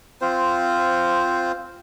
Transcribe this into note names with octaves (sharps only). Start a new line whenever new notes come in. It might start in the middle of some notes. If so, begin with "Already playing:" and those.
C4 F4 C5